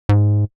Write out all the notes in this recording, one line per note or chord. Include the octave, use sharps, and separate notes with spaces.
G#2